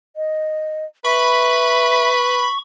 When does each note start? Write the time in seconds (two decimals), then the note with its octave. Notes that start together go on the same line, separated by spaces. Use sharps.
0.16 D#5
1.05 B4 E5 B5 C#6